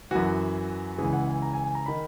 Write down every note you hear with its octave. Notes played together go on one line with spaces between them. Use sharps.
F#2 E3 F#4
C#2 C#3 E3 G#4
F#5
G#5
A#5
G#5
G#5
A#5
D#3 B5